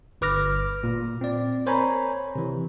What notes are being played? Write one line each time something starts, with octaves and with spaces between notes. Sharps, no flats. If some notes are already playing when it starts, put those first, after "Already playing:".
G1 B4 D6 F6 A#6
A#2
C4 D5
A#4 C5 C#5 G#5 A#5 B5
C3 E3